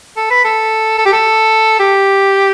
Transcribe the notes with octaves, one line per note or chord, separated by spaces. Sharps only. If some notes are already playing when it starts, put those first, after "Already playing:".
A4
B4
A4
A4
G4
A4
G4